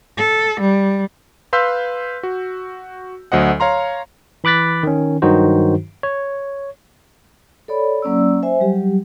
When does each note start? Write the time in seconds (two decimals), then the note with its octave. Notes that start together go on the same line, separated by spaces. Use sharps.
0.17 A4
0.60 G3
1.53 B4 F5 C6 E6 G6 B6
2.23 F#4
3.32 D2 F#3 C5 D#5 F#5
3.60 C#5 F5 A#5 C6
4.44 E3 B5 D6 F#6 A6 B6
4.83 D#3 C#4
5.22 G2 D#3 F#3 D#4 F#4 C5
6.03 C#5
7.68 A4 C#5 D5 B5
8.02 F#3 A#3 C#4 D5 E6
8.43 C5 E5 G#5
8.60 F#3 G3 G4